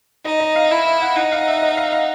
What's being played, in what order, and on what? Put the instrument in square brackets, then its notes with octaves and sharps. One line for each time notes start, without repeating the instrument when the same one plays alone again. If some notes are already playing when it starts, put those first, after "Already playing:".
[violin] D#4 [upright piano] D#5
[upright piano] D#5
F5
[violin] E4 [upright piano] E5
[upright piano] E5
F#5
[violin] D#4 [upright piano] F#5
[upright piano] F5
E5
D#5
F5
F5